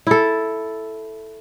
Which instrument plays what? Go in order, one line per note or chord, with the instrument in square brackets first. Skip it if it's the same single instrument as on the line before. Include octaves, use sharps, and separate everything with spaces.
[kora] E4 A4